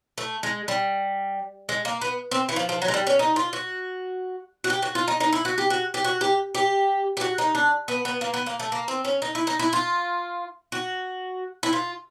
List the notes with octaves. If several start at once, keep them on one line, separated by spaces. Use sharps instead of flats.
A3
G#3
G3
G#3
A#3
B3
C4
E3
F3
F3
F#3
G#3
G3
C#4
D#4
F4
F#4
F#4
G4
F#4
F4
D#4
D#4
E4
F#4
G4
F#4
G4
F#4
G4
G4
G4
F#4
D#4
D4
B3
B3
A#3
B3
A#3
A3
A#3
C4
C#4
D#4
E4
D#4
E4
F4
F#4
E4
F4